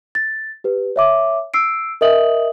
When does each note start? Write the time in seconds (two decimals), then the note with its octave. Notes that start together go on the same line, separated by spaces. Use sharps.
0.15 A6
0.64 G4 B4
0.96 C#5 E5 D6
1.54 E6 C7 D7
2.01 A#4 D#5 E5 D#6 F#7